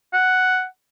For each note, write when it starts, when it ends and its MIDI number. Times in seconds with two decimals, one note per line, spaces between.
0.13 0.65 78